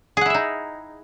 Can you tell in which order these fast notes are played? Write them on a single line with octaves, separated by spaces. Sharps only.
G#4 F#5 E4 E5 D#4